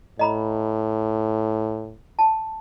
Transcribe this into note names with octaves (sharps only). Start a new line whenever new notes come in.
A2 D#5 A#5 B5
A5